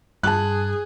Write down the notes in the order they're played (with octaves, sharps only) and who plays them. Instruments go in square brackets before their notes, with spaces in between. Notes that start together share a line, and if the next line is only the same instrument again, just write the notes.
[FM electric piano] G2 [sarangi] G#4 [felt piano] A5 F#6